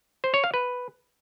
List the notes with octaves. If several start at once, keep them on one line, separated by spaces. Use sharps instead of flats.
C5
C#5
F5
B4